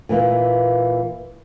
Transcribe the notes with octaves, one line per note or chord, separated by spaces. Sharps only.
A#2 E3 A#3